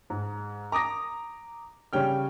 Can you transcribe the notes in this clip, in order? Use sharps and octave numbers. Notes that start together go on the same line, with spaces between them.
G#2
A#5 D6 D#6 A#6
C#3 G3 C#4 G5 F6